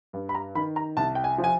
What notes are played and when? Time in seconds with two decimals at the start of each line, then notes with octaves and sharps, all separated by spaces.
0.13 G2
0.29 B5
0.35 A#5
0.55 D#3 B5
0.76 A#5
0.97 C2 A5
1.15 G5
1.24 G#5
1.38 F3
1.44 G#5